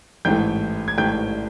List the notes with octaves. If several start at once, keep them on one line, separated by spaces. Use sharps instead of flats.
A1 G#2 E3 A3 G5 G6
G#6
A1 G#2 E3 A3 G5 G6